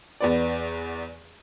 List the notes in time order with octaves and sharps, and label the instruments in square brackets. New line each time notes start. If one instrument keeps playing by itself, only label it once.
[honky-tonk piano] E2 B3 D5